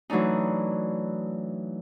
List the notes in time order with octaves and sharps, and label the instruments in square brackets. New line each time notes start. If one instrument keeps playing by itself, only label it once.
[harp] E3 F#3 A3 D4 D#4